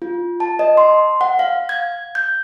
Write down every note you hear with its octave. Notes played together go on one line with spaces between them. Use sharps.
F4
A5
D#5
C6
F#5
F5
G#6
G6